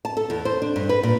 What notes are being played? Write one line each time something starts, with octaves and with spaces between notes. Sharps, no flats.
A5
A4
E2
C5
D4
G2
B4
A#2